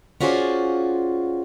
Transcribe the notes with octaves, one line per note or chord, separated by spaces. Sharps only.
C#4 F4 F#4 G#4 C5 D5